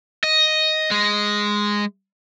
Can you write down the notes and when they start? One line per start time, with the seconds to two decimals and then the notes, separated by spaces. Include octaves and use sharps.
0.24 D#5
0.91 G#3